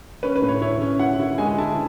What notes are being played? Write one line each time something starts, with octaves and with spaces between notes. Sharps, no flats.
C#4 B4
B4
A2
C#5
E4 C#5
C#4
E4 F#5
E4
G#3 G#5
E4 A5